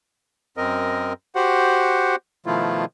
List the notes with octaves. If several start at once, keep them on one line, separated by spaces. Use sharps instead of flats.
F#2 C4 A#4 D#5
F#4 G4 C5 F#5
B2 D#3 F3 A3 E4 F4